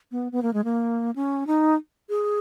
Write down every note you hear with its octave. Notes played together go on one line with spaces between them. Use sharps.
B3
B3
A#3
G#3
A#3
C#4
D#4
G#4